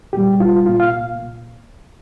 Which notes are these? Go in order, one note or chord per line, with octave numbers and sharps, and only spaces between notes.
C2 A#2 G3 G4
F4
C2 A#2 A#3 F4
F5